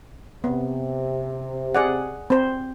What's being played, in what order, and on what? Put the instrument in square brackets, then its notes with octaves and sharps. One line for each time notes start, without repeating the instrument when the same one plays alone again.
[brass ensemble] C3 [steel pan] B3
[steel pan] G#4 D5 F#5
C4 C5